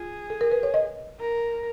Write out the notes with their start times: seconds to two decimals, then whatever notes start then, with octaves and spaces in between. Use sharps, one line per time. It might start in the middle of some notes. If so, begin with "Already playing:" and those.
Already playing: F4 G#4
0.30 A4
0.41 A#4
0.51 B4
0.63 C#5
0.74 D#5
1.20 A#4